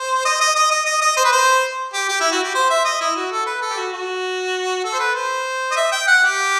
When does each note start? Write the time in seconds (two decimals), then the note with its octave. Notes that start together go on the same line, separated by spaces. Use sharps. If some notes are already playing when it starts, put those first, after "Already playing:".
Already playing: C5
0.25 D#5
0.41 D#5
0.55 D#5
0.71 D#5
0.86 D#5
1.01 D#5
1.17 C5
1.24 B4
1.32 C5
1.94 G4
2.09 G4
2.20 E4
2.32 F#4
2.43 G4
2.55 C5
2.70 E5
2.85 D#5
3.01 E4
3.16 F#4
3.31 A4
3.46 B4
3.62 A4
3.70 G4
3.77 F#4
3.92 F#4
4.84 A4
4.93 C5
4.99 B4
5.15 C5
5.71 D#5
5.76 E5
5.92 G5
6.07 F#5
6.22 G4